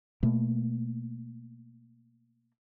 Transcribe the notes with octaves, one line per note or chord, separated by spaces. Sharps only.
B2 A3 A#3